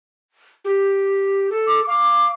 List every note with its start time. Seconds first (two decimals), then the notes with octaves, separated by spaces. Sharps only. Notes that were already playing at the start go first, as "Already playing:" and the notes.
0.65 G4
1.50 A4
1.67 D6
1.87 F5 D6